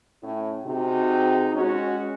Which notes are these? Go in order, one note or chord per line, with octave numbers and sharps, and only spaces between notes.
A2 C#4 E4
C3 D#4 F#4 G#4
G#3 C#4 F#4